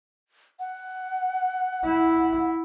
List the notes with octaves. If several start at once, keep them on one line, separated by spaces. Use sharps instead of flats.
F#5
E4